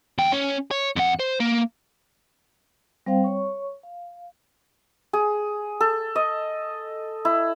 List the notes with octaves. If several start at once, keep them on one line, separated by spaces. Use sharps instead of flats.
E2 G5
C#4
C#5
F2 F#5
C5
A#3
G3 C4 C5 F5 G5
C#5 C#6
F5
G#4
A4
D#5
E4